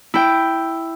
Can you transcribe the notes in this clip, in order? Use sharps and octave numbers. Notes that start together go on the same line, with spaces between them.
E4 G5